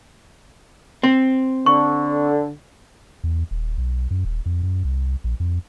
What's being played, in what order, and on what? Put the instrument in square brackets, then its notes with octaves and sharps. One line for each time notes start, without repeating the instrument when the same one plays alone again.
[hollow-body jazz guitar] C4
[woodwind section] D3 [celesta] C#6
[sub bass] E2
D#1
B1
F#2
D#1
F2
F#2
C2
A#1
F2